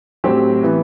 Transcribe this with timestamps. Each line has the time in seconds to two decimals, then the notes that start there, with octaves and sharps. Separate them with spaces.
0.24 A2 F#3 C4 G4
0.63 E3 B3